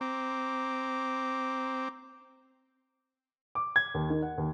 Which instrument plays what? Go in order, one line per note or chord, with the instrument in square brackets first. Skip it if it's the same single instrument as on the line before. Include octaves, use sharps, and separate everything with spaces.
[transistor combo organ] C4 [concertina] A#5 D6
[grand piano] D6
G#6
D#2
D#3
F#5
D#2